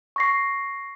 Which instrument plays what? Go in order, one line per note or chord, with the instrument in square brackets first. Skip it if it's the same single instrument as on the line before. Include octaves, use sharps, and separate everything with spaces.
[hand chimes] C#6 A#6 C7